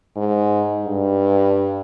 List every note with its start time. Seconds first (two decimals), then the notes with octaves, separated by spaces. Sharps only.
0.16 G#2
0.85 G2